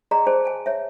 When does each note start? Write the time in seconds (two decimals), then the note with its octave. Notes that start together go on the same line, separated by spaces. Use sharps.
0.11 G#4 D5 D#5 A#5 C6
0.27 G#4 C5 D5 G#5 A5
0.45 G#5 A5
0.66 C#5 E5